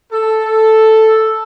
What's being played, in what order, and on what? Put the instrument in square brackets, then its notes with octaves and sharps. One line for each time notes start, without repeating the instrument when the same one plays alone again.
[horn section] A4